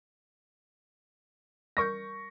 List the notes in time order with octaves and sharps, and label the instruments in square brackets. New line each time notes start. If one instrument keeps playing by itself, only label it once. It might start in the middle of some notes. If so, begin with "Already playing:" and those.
[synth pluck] G3 A#4 G6 [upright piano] C#6 A#6